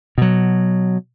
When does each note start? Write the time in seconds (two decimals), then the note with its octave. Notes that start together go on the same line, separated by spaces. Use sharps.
0.18 B2 F#3